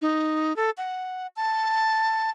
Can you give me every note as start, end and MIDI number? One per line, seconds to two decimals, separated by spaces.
0.02 0.55 63
0.56 0.71 69
0.77 1.27 78
1.36 2.30 81